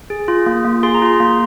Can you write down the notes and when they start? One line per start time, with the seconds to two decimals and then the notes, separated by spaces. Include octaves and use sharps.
0.10 G#4
0.28 F4
0.46 A#3
0.65 A#3
0.83 G#4 C6
0.95 A#5
1.02 F4 C6
1.20 A#3